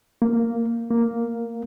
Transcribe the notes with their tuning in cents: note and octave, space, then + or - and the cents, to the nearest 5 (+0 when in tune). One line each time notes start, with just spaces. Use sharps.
A#3 -5
A#3 +0